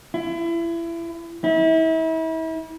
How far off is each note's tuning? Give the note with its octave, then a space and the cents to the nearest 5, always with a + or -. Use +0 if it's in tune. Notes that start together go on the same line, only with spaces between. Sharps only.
E4 +30
E4 -35